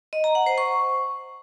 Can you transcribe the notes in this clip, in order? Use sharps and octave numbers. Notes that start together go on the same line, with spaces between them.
D#5
A#5
F#5
C5
C#6